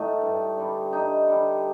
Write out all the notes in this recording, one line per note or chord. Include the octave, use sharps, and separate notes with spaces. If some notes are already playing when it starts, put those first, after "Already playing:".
Already playing: A2 A3 D#4
G2
D3 G3
G2 D#4
D3 G3